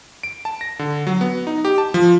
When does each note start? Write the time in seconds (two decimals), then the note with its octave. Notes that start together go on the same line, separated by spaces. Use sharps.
0.23 D7
0.45 A5
0.61 A#6
0.79 D3
1.07 F#3
1.21 B3
1.47 D#4
1.65 G4
1.78 A5
1.94 F3